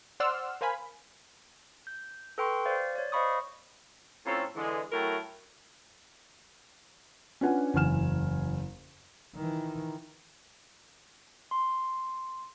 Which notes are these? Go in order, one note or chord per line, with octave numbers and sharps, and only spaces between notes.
C5 D5 F#5 C6 E6 F6
A#4 C5 F5 G#5 B5
G6
A4 B4 G5 C6 C#6
C5 D5 F5
C#5 D5
C5 D#5 F5 B5 C#6 D#6
A2 C4 C#4 F4 A4 A#5
D3 E3 G#3
F#3 A3 E4 A#4 G5 A5
C#4 D4 F4 B4 F#5 G#5
F#1 E2 G#5 F6 E7
D#3 E3
C6